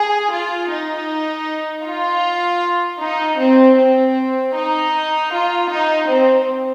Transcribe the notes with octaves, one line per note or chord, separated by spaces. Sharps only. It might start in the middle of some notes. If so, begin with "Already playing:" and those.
Already playing: G#4
F4
D#4
F4
D#4
C4
C4
D#4
F4
D#4
C4